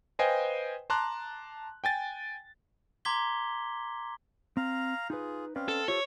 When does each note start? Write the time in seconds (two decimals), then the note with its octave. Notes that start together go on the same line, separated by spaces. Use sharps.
0.19 B4 C5 D#5 F5 G5 G#5
0.90 A5 A#5 C6 D6 F#6
1.84 G5 G#5 A6
3.05 A#5 C6 D6 G#6 B6 G7
4.57 C4 F5 A#5
5.10 D#4 F4 G#4 B4
5.56 C4 C#4 B4 D5 F5
5.68 A4
5.88 F4 G4 A4 C5 C#5